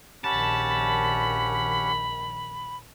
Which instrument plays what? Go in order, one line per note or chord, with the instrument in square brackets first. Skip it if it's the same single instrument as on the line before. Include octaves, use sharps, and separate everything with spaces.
[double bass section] A#1 D#3 [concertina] C#4 G4 F#5 [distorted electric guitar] A5 [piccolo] B5